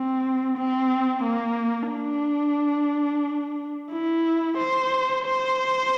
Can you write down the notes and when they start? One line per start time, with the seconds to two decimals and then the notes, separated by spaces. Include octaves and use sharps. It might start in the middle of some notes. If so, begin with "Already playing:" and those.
Already playing: C4
0.57 C4
1.23 A#3
1.91 D4
3.92 E4
4.58 C5
5.25 C5